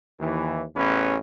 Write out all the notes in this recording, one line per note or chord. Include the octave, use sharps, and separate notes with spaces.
D#2 E3
A1 E2 C#4 B4